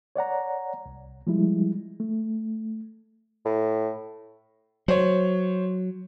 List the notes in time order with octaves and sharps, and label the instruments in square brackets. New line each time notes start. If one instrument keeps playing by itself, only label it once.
[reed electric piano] C#5 D5 F#5 A#5
C2
F3 G3 G#3 E4
A3
[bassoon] A2
[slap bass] F#3 [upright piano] C5 C#5